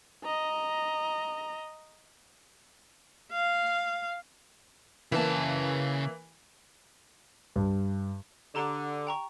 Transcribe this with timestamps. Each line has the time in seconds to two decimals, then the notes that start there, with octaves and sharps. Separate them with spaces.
0.24 D#5 A#5
3.32 F5
5.12 C#3 E3 A#3 A5
7.56 G2
8.55 D3 G4 A#5 G7
9.07 G5 A#5 C#6